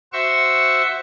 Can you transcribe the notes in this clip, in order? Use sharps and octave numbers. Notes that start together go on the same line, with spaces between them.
F#4 C5 E5 C#6 E6